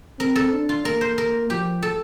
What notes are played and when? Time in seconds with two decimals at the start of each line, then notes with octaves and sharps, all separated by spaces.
0.20 C4 A#4
0.36 A4
0.52 D4
0.69 F4
0.85 A#3 A#4
1.01 C5
1.18 A#4
1.50 F3 G4
1.82 A4